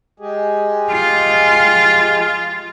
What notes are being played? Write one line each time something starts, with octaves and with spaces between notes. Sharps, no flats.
G#3 G4 G#4
F4